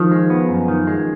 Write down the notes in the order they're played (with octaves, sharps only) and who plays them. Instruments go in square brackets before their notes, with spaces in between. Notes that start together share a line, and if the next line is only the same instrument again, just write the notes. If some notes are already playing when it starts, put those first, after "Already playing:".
Already playing: [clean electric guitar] D#3 [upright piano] F3
[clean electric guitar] G#3
B3
F#2
D#3
G#3